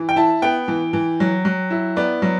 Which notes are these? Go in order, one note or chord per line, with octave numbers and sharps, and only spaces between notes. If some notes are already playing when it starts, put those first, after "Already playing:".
Already playing: E3
G5
E4 A5
B3 G5
E3
E3
F#3
F#3
E4
B3 D5
F#3